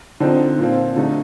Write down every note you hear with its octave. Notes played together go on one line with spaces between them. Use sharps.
D3 F3 C4 D#4
A#2 F3 C4 F4
D3 A3 D#4